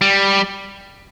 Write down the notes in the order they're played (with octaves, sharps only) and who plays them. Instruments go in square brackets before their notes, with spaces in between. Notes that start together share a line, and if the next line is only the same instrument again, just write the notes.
[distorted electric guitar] G3